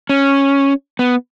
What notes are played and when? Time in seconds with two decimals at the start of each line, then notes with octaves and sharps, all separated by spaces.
0.09 C#4
0.99 B3